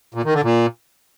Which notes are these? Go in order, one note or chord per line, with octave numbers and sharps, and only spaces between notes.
A#2
D#3
D3
A#2